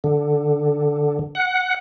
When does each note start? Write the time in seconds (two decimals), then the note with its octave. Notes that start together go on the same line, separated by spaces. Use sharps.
0.04 D3
1.35 F#5